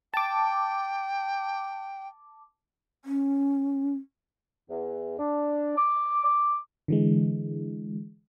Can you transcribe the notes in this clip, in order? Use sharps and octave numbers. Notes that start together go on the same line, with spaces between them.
G5 A5 D6
C#4
E2
D4
D6
D6
D3 E3 G#3